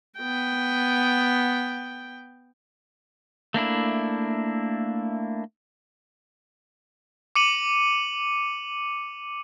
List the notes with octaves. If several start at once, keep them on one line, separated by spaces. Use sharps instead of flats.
B3 G5
A3 A#3 D4 E4
D6 C#7 D#7 F#7